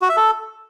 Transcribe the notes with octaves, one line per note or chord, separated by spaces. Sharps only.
F#4
E5
A4